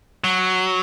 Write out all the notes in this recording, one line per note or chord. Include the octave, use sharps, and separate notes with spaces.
F#3